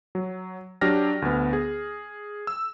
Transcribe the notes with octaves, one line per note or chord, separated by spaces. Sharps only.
F#3
F#3 D4 G4 F6 A#6
D2 B3
G#4
E6